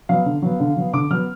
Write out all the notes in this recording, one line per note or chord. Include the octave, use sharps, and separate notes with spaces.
F#3 B3 F5
D3
F#3 B3
D3
F#3 B3
D3 D6
F#3 B3 F6